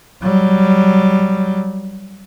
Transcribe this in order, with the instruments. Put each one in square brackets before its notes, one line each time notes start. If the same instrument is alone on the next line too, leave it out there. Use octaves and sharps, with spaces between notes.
[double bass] F#3 G3